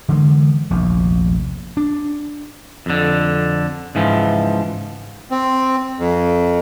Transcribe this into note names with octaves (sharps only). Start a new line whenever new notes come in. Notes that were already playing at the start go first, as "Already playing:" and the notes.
D3 E3 G#3
F1 A#1 D#2
D4
F2 D3
C#2 G#2 E3 F3
C4
F2